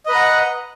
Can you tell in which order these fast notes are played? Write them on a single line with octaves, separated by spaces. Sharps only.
D#5 B4 A#5 F#5